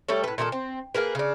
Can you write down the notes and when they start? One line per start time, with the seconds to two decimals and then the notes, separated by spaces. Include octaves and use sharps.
0.08 G3 A3 A4 C#5
0.24 A2 B4
0.38 A#2 D#3 E4 A4
0.52 C4
0.94 A#3 G#4 A#4 B4
1.15 C#3 D4